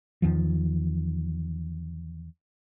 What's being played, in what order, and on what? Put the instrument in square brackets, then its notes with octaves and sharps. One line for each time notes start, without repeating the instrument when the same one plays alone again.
[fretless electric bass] E2 D#3 F3